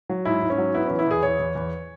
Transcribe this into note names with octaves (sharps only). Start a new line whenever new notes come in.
F#3
G#2 E4
G#2
C#4
F#3
B3 E4
E3 C#4
E4
E2 G#4
E2 C#5
E2
E2